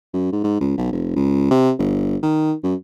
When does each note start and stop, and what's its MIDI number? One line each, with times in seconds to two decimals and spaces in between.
0.14 0.29 42
0.33 0.40 44
0.44 0.58 44
0.61 0.75 37
0.78 0.92 35
0.92 1.15 29
1.16 1.51 37
1.51 1.72 48
1.79 2.17 31
2.23 2.54 51
2.64 2.75 42